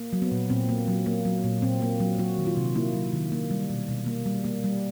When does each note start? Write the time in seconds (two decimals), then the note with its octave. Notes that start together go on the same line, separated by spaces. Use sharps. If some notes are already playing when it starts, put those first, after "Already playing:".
Already playing: A#3
0.13 F#3
0.22 B3
0.32 A#2
0.50 A#2 C4
0.69 A#3
0.88 F#3
1.06 A#3
1.25 F#3
1.44 A#2
1.62 A#2 C4
1.82 A#3
2.00 F#3
2.19 F#3 F#4
2.38 D#3
2.47 F4
2.57 C3
2.75 A#3 E4
2.94 F#3
3.13 D#3
3.32 A#3
3.51 G3
3.70 B2
3.88 B2
4.06 A#3
4.26 G3
4.44 A#3
4.64 G3